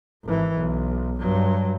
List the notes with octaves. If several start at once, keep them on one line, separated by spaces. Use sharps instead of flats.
G#1 E3
B1
G2 F#3